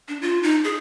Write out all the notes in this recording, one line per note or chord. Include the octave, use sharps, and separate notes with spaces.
D4
F4
D#4
G#4